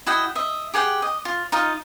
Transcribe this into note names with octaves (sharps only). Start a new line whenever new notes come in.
E4 F#4 D#5 G5
D#5 E5
G4 G#4 F#5 G5
D#5
F4
D#4 F4 D#5 F5